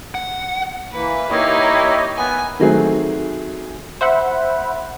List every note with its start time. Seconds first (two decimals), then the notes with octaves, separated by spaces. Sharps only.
0.15 F#5
0.93 E3 A#3 B4
1.30 A#3 D#4 E4 G4 C#5 D#5
2.17 B3 G#5
2.60 D#3 F#3 A3 C4 F#4 G#4
4.01 C5 E5 F#5 B5